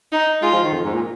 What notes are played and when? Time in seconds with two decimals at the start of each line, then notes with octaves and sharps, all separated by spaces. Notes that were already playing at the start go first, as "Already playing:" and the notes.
0.12 D#4
0.42 G#3 F4
0.53 F3
0.64 D#3
0.73 F2
0.84 G#2
0.94 A#2